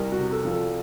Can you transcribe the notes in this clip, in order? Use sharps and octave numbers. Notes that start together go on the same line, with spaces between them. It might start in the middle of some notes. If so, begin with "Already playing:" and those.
Already playing: C2 A#4
F#4
C3
A4
F3
A4